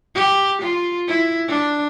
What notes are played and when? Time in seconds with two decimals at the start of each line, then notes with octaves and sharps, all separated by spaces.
0.15 G4
0.62 F4
1.08 E4
1.48 D4